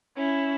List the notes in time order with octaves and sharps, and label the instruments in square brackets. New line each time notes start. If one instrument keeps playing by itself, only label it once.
[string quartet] C#4 E4